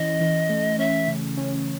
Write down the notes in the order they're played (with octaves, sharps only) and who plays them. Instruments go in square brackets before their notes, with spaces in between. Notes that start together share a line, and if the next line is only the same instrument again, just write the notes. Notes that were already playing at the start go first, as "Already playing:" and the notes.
Already playing: [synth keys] E3 C#4 [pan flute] D#5
[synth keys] E3
A3
[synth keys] C#4 [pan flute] E5
[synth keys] C#3
C#4